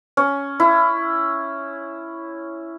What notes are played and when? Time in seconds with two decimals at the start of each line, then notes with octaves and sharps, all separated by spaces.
0.17 C#4
0.60 E4